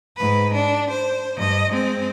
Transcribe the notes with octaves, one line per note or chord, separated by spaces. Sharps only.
G#2 B4
D4
C5
G2 D#5
G#3 C4